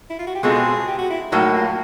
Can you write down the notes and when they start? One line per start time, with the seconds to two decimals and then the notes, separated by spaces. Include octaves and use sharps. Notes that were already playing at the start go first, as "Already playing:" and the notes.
0.10 E4
0.19 F4
0.27 F#4
0.35 G4
0.43 B2 G#3 C4 F4 G#4 A4
0.88 G4
0.99 F#4
1.10 E4
1.32 A2 F#3 A#3 D#4
1.54 F4